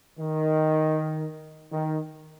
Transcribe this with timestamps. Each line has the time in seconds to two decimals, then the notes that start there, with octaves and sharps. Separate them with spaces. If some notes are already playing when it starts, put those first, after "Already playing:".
0.19 D#3
1.72 D#3